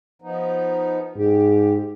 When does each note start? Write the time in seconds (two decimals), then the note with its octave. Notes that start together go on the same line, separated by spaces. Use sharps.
0.22 F3 B3 D#4
1.16 G#2 G4